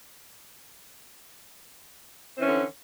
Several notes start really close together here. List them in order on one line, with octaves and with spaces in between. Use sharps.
C4 E3 C#4 D3